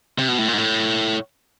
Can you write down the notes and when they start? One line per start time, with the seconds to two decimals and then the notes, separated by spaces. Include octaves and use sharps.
0.19 C3
0.28 B2
0.38 A2
0.48 A#2
0.53 G#2
0.58 A2